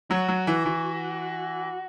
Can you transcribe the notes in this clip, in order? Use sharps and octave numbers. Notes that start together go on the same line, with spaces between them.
F#3 F#4
F#3
E3
E3